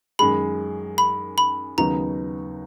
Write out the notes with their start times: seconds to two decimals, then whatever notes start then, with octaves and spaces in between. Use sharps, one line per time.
0.19 F#2 D#3 G#3 B5
0.98 B5
1.38 B5
1.78 D#2 C#3 F#3 B3 D#4 A#5